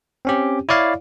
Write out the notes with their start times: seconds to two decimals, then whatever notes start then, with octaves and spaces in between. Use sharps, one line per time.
0.25 C4 C#4 G4
0.69 E4 C#5 D5 F5